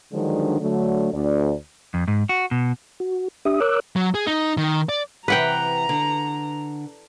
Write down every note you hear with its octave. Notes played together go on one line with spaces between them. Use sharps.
D3 D#3 F3 F#3 G#3 D4
D3 F#3 A3
D2 D5
F2
G#2
F#4
B2
F#4
D4 G4 E5 D#6
A#4 C#5 D6 E6 F#6
F#3
G#4
D#4
D#3
D5
C3 E3 B4 F#5 G5 A#5
D3